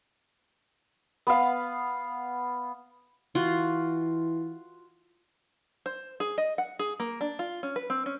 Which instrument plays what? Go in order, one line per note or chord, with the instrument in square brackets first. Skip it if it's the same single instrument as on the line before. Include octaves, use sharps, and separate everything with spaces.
[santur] B3 F5
[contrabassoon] E3 [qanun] F4 F#4
[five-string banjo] C5
G#4
D#5
F#5
G#4
A#3
D4
F4
C#4
B4
C4
C#4